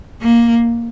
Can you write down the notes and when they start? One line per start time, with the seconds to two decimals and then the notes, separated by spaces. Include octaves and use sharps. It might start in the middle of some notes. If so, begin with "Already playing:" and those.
0.22 A#3